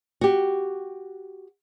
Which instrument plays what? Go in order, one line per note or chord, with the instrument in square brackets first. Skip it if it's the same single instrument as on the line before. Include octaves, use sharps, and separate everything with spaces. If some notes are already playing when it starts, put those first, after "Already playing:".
[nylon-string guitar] F#4 G4